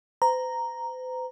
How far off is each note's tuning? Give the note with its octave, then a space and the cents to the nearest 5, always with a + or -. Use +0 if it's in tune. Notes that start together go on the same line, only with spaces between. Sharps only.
C5 -45 A#5 +0